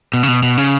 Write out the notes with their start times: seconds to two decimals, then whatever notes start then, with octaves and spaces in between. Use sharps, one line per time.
0.14 B2
0.23 C#3
0.28 B2
0.43 B2
0.58 C#3